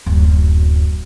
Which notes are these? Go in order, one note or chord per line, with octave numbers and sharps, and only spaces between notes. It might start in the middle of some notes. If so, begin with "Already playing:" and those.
D1 F#2